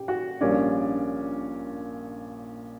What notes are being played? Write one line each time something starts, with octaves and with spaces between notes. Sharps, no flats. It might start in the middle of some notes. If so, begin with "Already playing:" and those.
Already playing: A#2 C#4 G4 G5
F#4 F#5
A#1 A#2 G3 A#3 C#4 D4 D5